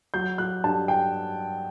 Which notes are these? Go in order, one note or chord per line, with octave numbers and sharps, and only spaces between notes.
F#3 G6
F#3 F#6
G2 A5
G5